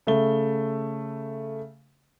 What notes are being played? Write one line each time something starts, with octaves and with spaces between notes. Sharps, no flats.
C#3 A3 E5 G7